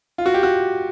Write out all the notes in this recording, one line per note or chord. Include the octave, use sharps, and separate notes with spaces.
F4
F#4
G4
F#4